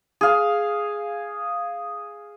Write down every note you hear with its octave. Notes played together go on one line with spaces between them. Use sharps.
G#4 F5